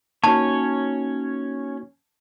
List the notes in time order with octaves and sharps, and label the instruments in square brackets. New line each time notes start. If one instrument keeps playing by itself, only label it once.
[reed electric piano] A#3 D#4 F#4 [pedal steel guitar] C#4 C#5 [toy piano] A5